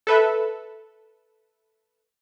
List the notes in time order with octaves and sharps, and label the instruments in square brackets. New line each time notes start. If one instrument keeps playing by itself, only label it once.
[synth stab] A4 B4 E5